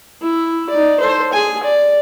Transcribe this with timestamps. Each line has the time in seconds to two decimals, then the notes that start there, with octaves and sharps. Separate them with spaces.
0.22 E4
0.70 D#4 D5
1.00 A4 C5
1.33 G#4 G#5
1.63 D5